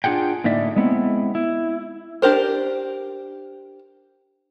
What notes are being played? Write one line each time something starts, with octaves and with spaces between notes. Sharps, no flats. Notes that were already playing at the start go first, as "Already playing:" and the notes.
D4 F4 G#4 F#5 G5
A2 D3 A#3 D#4 D5 E5
G#3 B3 C4 E4
E4
D4 G4 A#4 C5